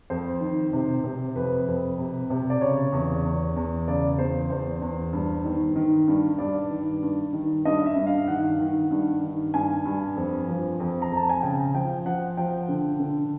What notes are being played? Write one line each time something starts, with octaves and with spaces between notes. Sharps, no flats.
F2 C5
D#3
C3
C3
F2 B4
F2
C3
C3
D5
C#3 C#5
E2
E2
E2
C#3 D5
E2 C5
E2 C5
E2
G2
D#3
D#3
G2
G2 D5
D#3
G2
D#3
G2 D#5
E5
G2
F5
D#3 F#5
D#3
G2
D#3
G2 G#5
G2
F2
F3
F2
A#5
F2 A5
G#5
C#3 G5
F3 G5
F3 F#5
F3 G5
D3
D3